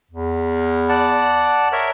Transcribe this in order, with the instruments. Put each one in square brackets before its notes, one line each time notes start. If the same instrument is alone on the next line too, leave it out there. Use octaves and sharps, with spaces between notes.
[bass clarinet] E2
[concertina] D5 F#5 A5
A#4 C#5 E5